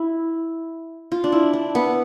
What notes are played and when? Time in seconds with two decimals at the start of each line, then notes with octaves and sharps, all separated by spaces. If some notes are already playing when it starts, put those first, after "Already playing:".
Already playing: E4
1.12 F4
1.24 D4
1.32 E4
1.53 D4
1.75 B3